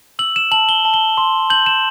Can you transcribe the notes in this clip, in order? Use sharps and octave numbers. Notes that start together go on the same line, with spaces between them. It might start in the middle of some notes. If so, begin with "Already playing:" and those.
E6 F#7
E7
A5 F#7
G7
A5
G7
C6
G6 F#7
E7